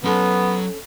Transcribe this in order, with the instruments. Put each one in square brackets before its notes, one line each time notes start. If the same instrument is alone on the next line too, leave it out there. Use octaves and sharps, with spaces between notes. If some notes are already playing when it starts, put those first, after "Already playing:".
[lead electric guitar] F#3 C6 [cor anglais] B3 [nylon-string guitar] C#4 A4